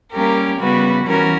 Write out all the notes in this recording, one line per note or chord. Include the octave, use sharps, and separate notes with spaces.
G3 A#3 C#4 G4 A#4
C#3 G3 B3 F#4 B4
E3 G3 C#4 F#4 A#4